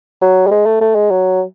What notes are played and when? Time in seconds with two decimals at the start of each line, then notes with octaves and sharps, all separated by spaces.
0.22 F#3
0.47 G3
0.51 G#3
0.66 A3
0.81 A3
0.95 G#3
1.11 F#3